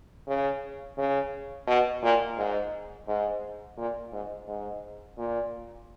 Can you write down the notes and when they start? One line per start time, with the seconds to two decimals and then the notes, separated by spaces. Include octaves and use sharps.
0.27 C#3
0.97 C#3
1.67 B2
2.02 A#2
2.37 G#2
3.07 G#2
3.77 A#2
4.12 G#2
4.47 G#2
5.18 A#2